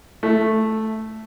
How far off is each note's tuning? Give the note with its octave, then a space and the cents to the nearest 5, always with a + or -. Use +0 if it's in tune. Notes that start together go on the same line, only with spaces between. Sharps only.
A3 -5